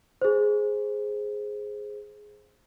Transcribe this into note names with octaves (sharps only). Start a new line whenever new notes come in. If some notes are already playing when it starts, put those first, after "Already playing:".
G#4 C5